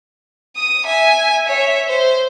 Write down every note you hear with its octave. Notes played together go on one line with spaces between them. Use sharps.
D#6 D#7
E5 G#5
C#5 E5
C5